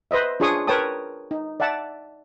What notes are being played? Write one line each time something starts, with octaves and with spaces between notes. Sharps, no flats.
B4 C5 D#5 E5
D4 F4 G#4 C#5 C#6 D#6
A#4 B4 C#5 G5 A5 D#6
D#4
D5 E5 F#5 A5